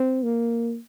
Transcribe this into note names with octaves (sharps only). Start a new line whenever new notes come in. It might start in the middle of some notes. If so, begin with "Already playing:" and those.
Already playing: C4
A#3